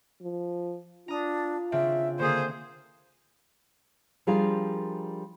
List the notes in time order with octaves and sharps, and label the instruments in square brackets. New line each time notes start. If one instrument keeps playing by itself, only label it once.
[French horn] F3
[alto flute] D4 [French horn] F4 [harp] A#5 D#6
[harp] C#3 C4 D4 [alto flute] E5
[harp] D3 [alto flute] A#3 [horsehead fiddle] G#4 C5
[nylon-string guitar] F3 G3 D4 F4 G#4 A#4